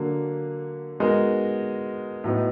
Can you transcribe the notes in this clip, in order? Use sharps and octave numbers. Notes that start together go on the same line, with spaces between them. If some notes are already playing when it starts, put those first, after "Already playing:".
Already playing: D3 F#3 A#3
G#3 B3 D#4 F#4 A#4
A2 F#3 B3 D#4